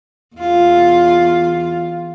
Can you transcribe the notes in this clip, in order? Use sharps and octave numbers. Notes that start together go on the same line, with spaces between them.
E2 F4